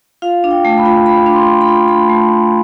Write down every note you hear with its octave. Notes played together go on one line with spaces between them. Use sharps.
F4 F5
D4
G5
A3
B5
F4
A3 B5
D4
C6
F4
B5
F4
A3 B5
A3